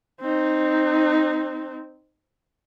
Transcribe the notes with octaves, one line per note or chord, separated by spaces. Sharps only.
C4 D#4